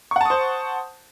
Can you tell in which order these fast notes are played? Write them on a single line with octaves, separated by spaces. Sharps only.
C#6 F#5 A5 D#6 C5